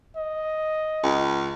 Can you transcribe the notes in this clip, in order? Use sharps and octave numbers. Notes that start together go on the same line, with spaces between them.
D#5
C#2